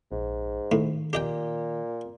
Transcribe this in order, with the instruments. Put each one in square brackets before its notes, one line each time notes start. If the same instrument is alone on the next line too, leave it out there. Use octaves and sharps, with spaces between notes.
[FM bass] A#1 [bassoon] G#2
[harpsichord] A2 [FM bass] D#3
[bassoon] A#2 [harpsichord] G4 D#5 G5